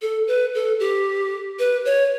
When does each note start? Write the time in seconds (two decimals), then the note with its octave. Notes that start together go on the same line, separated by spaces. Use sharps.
0.02 A4
0.28 B4
0.55 A4
0.80 G4
1.59 B4
1.85 C#5